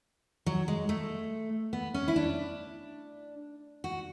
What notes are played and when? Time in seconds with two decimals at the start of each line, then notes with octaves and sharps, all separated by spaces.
0.46 F#3
0.68 G#3
0.89 A3
1.73 B3
1.94 C#4
2.08 E4
2.16 D4
3.84 F#4